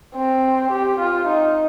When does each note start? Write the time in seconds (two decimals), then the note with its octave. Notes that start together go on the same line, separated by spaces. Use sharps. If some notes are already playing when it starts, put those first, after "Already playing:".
0.15 C4
0.71 G4
0.99 F4
1.27 D#4